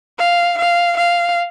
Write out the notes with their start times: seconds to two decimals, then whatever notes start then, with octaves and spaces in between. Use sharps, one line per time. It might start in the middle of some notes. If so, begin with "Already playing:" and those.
0.18 F5
0.58 F5
0.97 F5